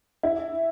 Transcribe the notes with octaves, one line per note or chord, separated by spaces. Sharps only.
E4